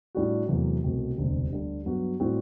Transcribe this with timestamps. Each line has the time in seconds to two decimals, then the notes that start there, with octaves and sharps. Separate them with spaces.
0.15 A2 G3 D4 F#4
0.49 E2 C3 F#3 A3
0.83 C2 B2 A3 C4 F#4
1.17 E1 D2 C3 G3 D4
1.51 D2 D3 G3
1.86 G2 F#3 B3 F#4
2.20 A2 G3 C4 F#4